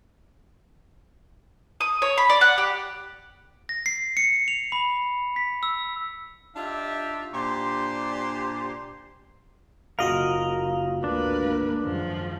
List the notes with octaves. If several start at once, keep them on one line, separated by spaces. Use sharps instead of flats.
D#6
C#5
B5
D5
F#5
G4
A#6
C7
C#7
F7
B5
B6
E6
D4 D#4 F4 G4 E5
A#2 D4 G4 C5 C6
F#1 C#3 F4 F#4 A#4 D#5 F5
G#1 D2 A#3 D4 A#4 B4
F#2 D#3 F3 G#3